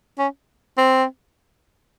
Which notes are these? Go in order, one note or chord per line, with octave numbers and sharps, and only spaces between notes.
C#4
C4